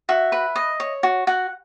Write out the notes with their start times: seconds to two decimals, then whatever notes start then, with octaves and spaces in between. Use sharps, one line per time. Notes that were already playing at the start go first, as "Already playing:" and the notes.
0.09 F#4 E5
0.32 B4
0.56 D#5
0.80 C#5
1.03 F#4
1.27 F#4 F#5